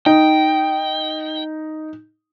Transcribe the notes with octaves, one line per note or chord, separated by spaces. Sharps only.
D#4 G5